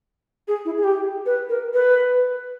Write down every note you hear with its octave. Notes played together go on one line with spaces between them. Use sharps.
G#4
E4
G#4
G4
B4
A#4
B4